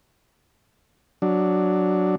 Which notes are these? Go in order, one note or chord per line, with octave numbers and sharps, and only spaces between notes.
F#3 D4